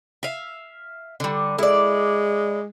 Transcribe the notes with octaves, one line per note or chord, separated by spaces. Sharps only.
E5 F5
D3 G3
G#3 E4 D5